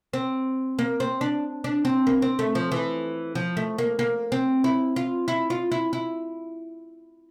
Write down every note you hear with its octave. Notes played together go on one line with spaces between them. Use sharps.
C4
A#3
C4
D4
D4
C4
A#3
C4
A3
F3
E3
F3
A3
A#3
A#3
C4
E4
F4
E4
F4
E4
E4